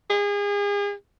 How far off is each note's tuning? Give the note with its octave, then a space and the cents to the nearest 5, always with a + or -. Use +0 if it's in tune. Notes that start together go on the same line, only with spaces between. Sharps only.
G#4 -35